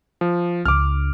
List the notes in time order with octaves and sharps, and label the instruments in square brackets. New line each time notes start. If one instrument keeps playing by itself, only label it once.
[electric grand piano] F3
[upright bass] C#2 [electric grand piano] D6 F6